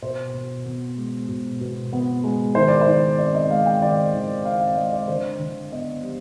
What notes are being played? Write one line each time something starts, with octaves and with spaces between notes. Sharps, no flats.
B2 C5
B2
B3
G#3
B2
B2
B3
G#3
D#3 C5
D5
C5
D#3
C4 D5
D#5
G#3 F5
G5
D#3 D5
D#3
C4 F5
F5
G#3 D#5
D5
D3 C5
D3
B3 D#5
G3